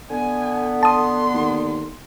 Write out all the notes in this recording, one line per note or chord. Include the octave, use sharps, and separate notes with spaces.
D3 B3 G#5
A5 C6 D#6
D#2